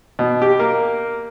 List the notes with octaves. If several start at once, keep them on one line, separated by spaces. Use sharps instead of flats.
B2
G4
A#3